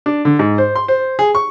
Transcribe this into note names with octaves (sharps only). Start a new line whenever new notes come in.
D4
D3
G#2
C5
C6
C5
G#4
C#6